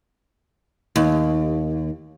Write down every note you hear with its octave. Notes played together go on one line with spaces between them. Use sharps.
D#2